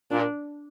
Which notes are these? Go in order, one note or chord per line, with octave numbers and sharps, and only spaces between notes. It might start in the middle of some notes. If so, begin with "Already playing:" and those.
A#2 D4